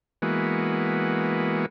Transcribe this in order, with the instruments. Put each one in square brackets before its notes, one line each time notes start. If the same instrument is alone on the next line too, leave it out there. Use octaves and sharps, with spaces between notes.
[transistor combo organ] E3 G#3 A#3 B3 F#4